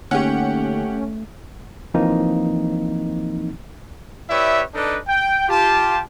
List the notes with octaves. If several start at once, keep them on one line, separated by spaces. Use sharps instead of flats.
D3 A3 A#3 C#4 D#4 G4 F#5
E3 F3 A#3 C4 D#4
E4 G4 B4 C#5 D5 E5
D4 D#4 A4 B4 D5
G5
F4 G4 A5